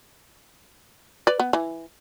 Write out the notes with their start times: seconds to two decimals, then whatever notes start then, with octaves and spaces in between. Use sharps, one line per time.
1.27 B4 D5
1.40 B3
1.53 E3